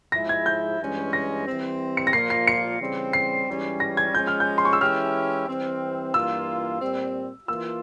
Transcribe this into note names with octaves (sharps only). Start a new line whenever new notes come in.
G#2 F3 G#3 E4 A#6
G#6
G6
G2 E3 G#3 C#4
A#6
E3 G3 C4
C#7
A#6
A#2 F3 A#3 F4 C7
C7
C#7
C#3 E3 G3 C4
C7
G#2 E3 G3 C#4 G4
A#6
G#6
F3 G#3 C#4 G6
F6
G6
C6
C#6
E6
E3 G#3 C#4 E4 G4 F6
E3 G3 C4
G2 E3 A#3 F4 E6
A#2 G3 C4
E3 A#3 F4 E6